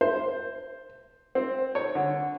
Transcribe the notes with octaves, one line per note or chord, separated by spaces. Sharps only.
C5
C4
C#5
D3